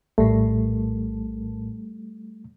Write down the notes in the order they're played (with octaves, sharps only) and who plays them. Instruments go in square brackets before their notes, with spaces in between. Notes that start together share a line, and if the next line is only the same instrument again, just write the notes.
[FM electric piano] A#1 A2 [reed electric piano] G3 A3